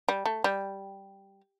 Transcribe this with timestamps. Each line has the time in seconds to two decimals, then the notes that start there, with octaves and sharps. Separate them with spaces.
0.09 G3
0.26 A3
0.44 G3